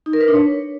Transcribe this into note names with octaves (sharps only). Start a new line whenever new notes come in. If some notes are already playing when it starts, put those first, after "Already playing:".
D#4
A#4
B4
D4
C#5